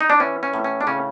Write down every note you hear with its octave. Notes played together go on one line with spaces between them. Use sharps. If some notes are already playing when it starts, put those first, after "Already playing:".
D#4
D4
E3 C#4
C#4
A2
C#4
D4
C#3 C#4